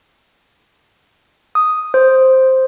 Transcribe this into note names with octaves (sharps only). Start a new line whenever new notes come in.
D#6
C5